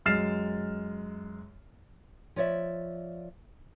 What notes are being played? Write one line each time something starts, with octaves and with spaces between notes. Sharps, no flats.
F#2 G#3 F6 A6 C7 E7
F3 C#5 D5 E5